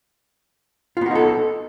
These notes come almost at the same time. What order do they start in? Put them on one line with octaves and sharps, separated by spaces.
F4 B3 F#4 D#4 A4